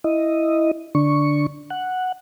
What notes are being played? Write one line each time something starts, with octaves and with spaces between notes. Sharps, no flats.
E4 D#5
D3 D4 C#6
F#5